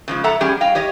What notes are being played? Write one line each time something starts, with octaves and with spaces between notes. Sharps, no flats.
C#3 F3 G#3
A4 E5 F#5 A#5
G3 C#4 G4 G#4
D#5 F5 G5
G4 C#5 D#5